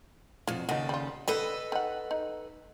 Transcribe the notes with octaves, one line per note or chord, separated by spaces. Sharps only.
F2 B2 F4
D#2 C#3 D#4 A4 F#5
G3 F4
D3 G3 A4 B4 D#5
D#3 F#5
D#4